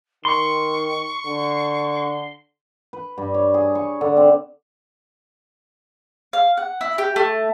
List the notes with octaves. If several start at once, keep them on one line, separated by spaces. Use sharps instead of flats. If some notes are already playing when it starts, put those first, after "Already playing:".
D#3 C6 C#6
D3
B4
G2
C#5
G#4
C#6
D3
C4
F5
F#5
E4
G4
A3